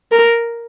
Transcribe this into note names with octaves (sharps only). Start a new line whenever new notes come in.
A#4